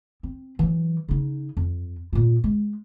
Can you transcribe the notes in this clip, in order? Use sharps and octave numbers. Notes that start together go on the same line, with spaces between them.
C4
E3 F#3
C#3 D#4
F2
A#2 F4
G#3